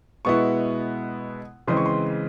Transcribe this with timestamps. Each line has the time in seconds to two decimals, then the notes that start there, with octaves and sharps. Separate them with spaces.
0.25 B2 G#3 B3 E4 C#6
1.68 C#3 E3 G#3 C4 C6
1.77 C#6
1.86 C6